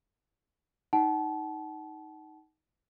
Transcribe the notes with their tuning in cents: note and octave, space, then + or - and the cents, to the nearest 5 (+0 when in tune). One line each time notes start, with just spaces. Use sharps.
D#4 +10 F#5 +35 A5 -35